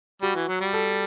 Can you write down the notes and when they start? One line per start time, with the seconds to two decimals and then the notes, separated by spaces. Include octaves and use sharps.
0.22 G3 F#4
0.35 E3
0.48 F#3
0.61 G3
0.73 A4